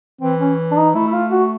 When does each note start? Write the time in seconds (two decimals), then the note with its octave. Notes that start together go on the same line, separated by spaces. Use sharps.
0.21 E3 C4
0.39 C#4
0.71 D4
0.77 D#4
0.95 A3 E4
1.07 E4
1.13 F4
1.31 F#4